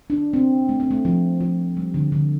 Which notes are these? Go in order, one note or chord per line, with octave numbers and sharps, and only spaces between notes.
D4
C4
A3
C4
A3
F3
F3
G3
D3
D3